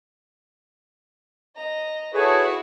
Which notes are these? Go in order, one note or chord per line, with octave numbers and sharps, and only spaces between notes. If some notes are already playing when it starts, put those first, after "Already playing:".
D#5 A#5
E4 F#4 G#4 A4 B4 C#5